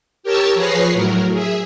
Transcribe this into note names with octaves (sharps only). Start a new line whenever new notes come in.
G4 A#4 C#5 A5 C#6 E6
F3 G#4 B4 C#5 A#6 C7
A2 F#3 A#4
G#4 E5